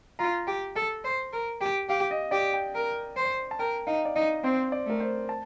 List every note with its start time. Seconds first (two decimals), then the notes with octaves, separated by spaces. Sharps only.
0.19 F4 A#5
0.47 G4
0.76 A4
1.04 C5
1.33 A#4
1.61 G4
1.89 G4 F5
2.11 D#5
2.31 G4 D5
2.54 G5
2.75 A#4
3.16 C5
3.51 A5
3.59 A#4 G5
3.87 D#4 F5
4.05 D5
4.16 D#4 D#5
4.43 C4 C5
4.72 D5
4.86 A3 A#4
5.00 C5
5.29 A5